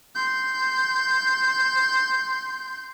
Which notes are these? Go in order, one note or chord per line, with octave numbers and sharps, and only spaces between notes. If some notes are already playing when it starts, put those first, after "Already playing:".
C6 G6